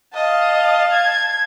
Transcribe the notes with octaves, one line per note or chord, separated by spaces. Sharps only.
D#5 F5 A5
G#6